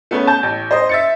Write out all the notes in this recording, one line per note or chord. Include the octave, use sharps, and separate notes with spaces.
A3 B3 C#4
A5 G6
A1
C5 D#5
E5 A6 C#7